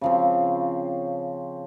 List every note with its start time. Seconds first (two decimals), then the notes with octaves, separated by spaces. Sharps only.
0.01 C#3 F3 C4